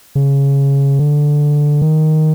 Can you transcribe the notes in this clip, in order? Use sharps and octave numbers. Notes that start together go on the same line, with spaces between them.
C#3
D3
D#3